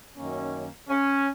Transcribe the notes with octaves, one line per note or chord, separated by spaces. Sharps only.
F#2 D#3 A#3 C#4
C#4